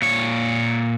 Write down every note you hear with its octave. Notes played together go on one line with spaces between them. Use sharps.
A#2 C#5